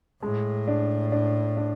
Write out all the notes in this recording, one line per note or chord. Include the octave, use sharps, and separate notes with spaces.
A2 G#3
D4
D4
D4